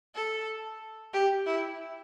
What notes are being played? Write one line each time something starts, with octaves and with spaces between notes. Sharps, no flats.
A4
G4
E4